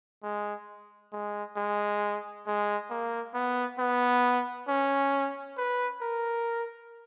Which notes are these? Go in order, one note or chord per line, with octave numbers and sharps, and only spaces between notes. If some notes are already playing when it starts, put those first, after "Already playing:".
G#3
G#3
G#3
G#3
A#3
B3
B3
C#4
B4
A#4